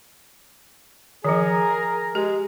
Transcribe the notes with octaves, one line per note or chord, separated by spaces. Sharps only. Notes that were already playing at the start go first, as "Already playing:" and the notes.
D#3 F3 G#4 A#4
G#3 G4